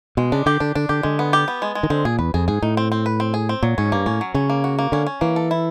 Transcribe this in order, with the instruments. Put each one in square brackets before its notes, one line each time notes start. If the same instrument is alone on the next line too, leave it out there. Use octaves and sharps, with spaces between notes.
[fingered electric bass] B2 [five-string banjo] G#3
[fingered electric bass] C#3 [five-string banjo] D4
[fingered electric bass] D3 [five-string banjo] G4
[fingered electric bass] D3 [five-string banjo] D4
[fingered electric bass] D3 [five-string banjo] D4
[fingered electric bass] D3 [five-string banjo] G4
[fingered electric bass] D3 [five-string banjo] G#3
[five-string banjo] B3
G4
B3
G#3
G#3
[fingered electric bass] D#3
[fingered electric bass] D3 [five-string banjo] C4
[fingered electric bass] A#2 [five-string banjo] G#4
[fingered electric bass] E2 [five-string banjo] B4
[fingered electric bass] F2 [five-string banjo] G#4
[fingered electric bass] G#2 [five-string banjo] G#4
[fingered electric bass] A2 [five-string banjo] D#4
[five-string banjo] C4
C4
B4
C4
G#4
C4
[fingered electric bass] A#2 [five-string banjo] F#3
[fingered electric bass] G#2 [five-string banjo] C#4
[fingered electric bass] G2 [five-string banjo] A#3
[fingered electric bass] A2 [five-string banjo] C#4
[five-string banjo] F#3
[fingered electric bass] C#3 [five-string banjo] C#4
[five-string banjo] A#3
F#4
A#3
[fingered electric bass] D3 [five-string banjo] C#4
[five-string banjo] C#4
[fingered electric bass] E3 [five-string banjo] A#3
[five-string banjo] A4
E4